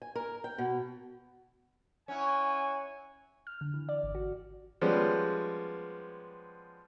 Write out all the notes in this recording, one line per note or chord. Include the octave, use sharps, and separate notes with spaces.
G#5
A#4
G5
B2
C#4 E4 F#5 G#5
F6
D3
E3
D5
G#1
F#4
F3 G3 G#3 B3 C#4